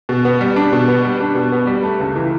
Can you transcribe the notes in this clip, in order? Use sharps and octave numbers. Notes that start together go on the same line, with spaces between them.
B2
B3
G3
D4
B2
B3
G3
D4
B2
B3
G3
A3
C#2
E3